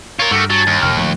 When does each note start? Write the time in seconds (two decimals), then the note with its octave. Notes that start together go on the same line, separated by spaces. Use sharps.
0.19 F4 A#4 C#5
0.31 G2 A3 F#4 G4 A#4
0.50 F#3 G#5 A5
0.67 D#2
0.82 F1 A#4 G5 F6
0.96 D1 C#3 F3 A3 C#6 F#6